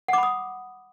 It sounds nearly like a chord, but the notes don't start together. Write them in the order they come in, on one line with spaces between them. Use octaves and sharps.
F#5 D6 B5 D#6